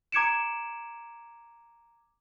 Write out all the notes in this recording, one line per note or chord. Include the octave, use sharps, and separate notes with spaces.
A#5 D6 G#6 C#7 D7 E7